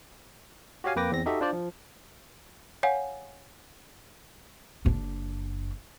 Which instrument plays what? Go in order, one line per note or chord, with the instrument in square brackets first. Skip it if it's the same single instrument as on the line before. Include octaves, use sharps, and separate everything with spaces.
[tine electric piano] F#4 G4 C#5 F5 G#5
F2 A#3 B4 G5 D6 A#6
E2 C4 A#6
D#4 F#4 G4 A4 D#5 E5
D4 F4 C5 D5
F3
[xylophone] C#5 F5 F#5 G#5
[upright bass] F#1 D4